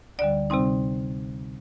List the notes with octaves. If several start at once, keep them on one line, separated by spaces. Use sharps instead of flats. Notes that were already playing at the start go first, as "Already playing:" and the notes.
D2 D3 G3 D5
C3 G3 C4 D#4